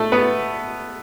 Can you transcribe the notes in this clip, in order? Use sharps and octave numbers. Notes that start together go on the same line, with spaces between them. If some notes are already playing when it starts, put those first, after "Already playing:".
Already playing: A3 A4
B3 B4